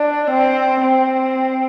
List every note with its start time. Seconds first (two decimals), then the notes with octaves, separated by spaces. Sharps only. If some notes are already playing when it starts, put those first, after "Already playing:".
Already playing: D4
0.30 C4
0.81 C4